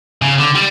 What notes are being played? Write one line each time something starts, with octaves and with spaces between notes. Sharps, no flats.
C#3
D3
G3